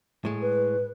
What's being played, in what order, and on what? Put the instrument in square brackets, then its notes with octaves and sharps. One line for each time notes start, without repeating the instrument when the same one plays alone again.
[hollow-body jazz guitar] A2 G#3
[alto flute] B4